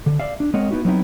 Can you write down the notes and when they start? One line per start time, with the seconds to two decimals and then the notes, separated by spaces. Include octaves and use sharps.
0.06 D3
0.20 D5 E5 F5
0.40 D4
0.54 G#3 C4 A#4 C#5 D#5 F#5
0.71 B3 D#4 E4 F#4
0.85 F#3 B3 C4 D#4 E4